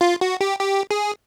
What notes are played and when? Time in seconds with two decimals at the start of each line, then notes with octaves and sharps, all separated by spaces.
0.01 F4
0.21 F#4
0.41 G4
0.61 G4
0.91 G#4